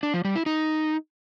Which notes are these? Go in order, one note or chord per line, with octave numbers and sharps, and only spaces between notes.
D4
F3
G3
E4
D#4